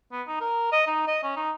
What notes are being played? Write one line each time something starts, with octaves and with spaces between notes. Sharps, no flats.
B3
D#4
A#4
D#5
D#4
D#5
C#4
D#4